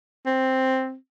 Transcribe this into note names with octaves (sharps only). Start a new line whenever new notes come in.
C4